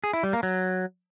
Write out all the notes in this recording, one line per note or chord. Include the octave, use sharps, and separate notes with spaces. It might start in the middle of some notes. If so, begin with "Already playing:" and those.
G#4
E4
G3
A#3
F#3